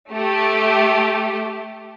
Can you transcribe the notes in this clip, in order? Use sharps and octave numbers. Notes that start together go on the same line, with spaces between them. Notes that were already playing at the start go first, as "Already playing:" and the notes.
A3 G4